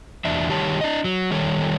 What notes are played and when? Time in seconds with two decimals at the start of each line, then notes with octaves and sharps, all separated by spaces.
0.25 E2 D4 E5
0.50 D#3 G3 G4 C#5 A5
0.81 D4 D#5
1.04 F#3
1.31 D#3 G3 A4 C#5